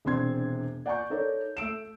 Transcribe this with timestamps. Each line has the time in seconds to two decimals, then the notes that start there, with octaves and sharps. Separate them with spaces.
0.05 E1 C3 C4 D4 C6 G#6
0.86 D5 F#5 G#5 A#5 C#6 G6
1.10 D#4 A4 A#4 C#5 D5
1.57 A3 E6 D7 E7